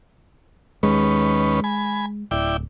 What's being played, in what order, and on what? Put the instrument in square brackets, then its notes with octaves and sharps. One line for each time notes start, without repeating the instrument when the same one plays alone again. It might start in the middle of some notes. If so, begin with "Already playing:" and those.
[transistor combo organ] D#2 C#4 B4 [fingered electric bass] G#3
[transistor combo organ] G#5 B5
[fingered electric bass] D1 [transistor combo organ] E4 D5 G5